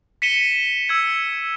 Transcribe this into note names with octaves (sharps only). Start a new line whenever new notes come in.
B6 C#7 D#7 E7 G7
E6 G#6